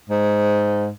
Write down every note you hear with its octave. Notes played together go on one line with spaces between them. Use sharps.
G#2